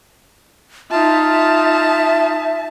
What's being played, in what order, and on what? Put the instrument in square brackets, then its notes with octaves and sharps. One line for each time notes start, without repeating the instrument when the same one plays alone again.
[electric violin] D#4 F4 [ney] E5 [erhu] A5